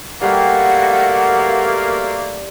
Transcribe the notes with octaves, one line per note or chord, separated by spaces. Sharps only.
B2 G3 A3 A#3 F#5